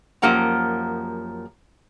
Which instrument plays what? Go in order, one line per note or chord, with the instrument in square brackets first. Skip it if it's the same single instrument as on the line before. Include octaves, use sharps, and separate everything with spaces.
[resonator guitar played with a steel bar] F#2 F3 A#3 G4 F#5 A#5